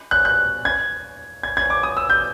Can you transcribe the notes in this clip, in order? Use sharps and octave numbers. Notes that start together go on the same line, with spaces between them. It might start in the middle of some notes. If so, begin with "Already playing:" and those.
F#6
F#6
G#6
G#6
G#6
D6
D#6
E6
G6